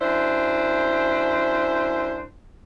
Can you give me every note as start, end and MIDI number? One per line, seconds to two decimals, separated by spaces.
0.01 2.25 42
0.01 2.25 62
0.01 2.25 64
0.01 2.25 72